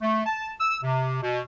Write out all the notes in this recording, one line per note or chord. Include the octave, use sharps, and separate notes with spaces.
A3
A5
E6
C3
B2